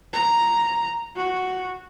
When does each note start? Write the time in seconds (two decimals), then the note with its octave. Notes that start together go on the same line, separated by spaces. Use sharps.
0.13 A#5
1.16 F#4